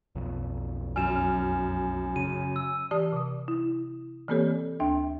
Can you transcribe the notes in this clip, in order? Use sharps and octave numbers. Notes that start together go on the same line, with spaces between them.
B1 F2
F#2 G#5 F6 E7
C#3 D#7
E6
E3 G4 D5 A5 D#6
C3 D#6
E4
E3 A#3 C4 G4 A4 C#5
D2 D4 E5 G5